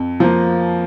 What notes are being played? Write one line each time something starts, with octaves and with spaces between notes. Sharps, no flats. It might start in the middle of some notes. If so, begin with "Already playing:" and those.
Already playing: F2
F3 A#3